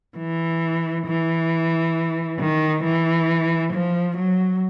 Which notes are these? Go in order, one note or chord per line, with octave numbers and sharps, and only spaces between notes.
E3
E3
D#3
E3
F3
F#3